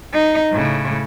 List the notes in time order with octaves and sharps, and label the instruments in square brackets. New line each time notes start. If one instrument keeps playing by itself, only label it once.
[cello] D#4
A2 C#3